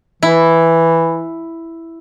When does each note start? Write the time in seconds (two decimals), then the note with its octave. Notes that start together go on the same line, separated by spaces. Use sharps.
0.23 E3 E4